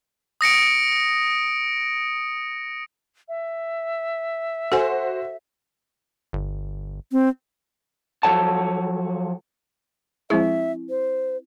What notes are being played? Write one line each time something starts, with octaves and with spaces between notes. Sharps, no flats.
D#6 A#6 C#7 D7
E5
F#4 A4 C5 G#5
G1
C4
F3 F#3 A4 C#5 F#5 A5
F3 G#3 C4 E4 G#4 E5
C5